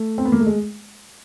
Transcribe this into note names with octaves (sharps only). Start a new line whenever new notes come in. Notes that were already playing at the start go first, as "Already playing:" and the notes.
Already playing: A3
C4
B3
A#3
A3
G#3